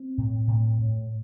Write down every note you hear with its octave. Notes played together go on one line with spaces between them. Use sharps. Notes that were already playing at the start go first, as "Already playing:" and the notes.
Already playing: C4
A2
A2
A2